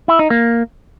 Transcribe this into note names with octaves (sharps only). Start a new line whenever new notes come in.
E4
D#4
A#3